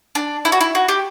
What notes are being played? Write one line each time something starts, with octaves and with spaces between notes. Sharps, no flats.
D4
E4
F#4
E4
F#4
G4